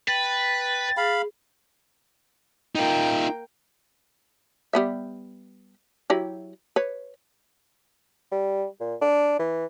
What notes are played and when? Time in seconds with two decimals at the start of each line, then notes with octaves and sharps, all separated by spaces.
0.08 B4 G5 A6
0.97 G#4 F5 B5
2.75 A#3 D#4 F4 G5
4.73 G3 B3 E5
6.10 F#3 E4 G4
6.76 B4 C#5
8.32 G3
8.80 A#2
9.02 D4
9.39 E3